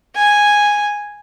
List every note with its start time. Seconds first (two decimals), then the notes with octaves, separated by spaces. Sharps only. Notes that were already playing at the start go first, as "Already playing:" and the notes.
0.16 G#5